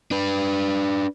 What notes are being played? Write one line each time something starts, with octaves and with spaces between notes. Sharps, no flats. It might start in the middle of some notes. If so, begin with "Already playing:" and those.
D4 B4